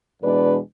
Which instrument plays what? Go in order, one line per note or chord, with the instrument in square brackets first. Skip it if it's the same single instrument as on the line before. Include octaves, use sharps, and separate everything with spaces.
[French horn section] E2 B2 G#3 D4 B4 D5